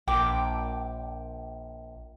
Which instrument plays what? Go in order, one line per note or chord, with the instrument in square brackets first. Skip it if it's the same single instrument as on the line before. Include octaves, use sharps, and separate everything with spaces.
[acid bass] A#1 [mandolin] G5 D6